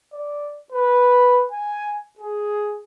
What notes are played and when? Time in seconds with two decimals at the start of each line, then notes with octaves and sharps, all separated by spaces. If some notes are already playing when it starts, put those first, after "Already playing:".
0.13 D5
0.72 B4
1.52 G#5
2.19 G#4